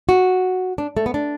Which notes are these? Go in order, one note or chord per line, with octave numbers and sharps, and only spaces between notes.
F#4
D4
A3
B3
D4